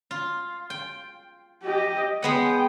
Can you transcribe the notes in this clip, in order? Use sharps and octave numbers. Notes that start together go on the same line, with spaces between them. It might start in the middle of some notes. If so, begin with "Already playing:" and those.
F4
G5
G4 D#5
G#3 B3 F#5 G5